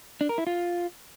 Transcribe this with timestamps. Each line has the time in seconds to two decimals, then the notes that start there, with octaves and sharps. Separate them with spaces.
0.21 D4
0.29 A#4
0.38 E4
0.47 F4